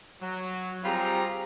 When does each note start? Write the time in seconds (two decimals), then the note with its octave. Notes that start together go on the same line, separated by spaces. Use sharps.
0.22 F#3
0.85 G3 C4 F4 G4 G#4 A#5